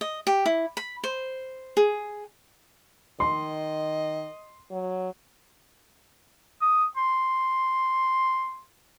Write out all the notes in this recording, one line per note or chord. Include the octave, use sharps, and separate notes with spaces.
D#5
G4
E4
B5
C5
G#4
D#3 D#5 C6
F#3
D#6
C6